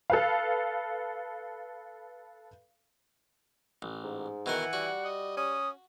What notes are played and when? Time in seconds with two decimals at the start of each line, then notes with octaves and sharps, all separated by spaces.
0.10 A4 B4 F5
3.82 A1
4.03 G#2
4.46 B2 D#3 E3 A#4 F#5
4.73 G3 F#4
5.05 D#5
5.37 C#4 D#6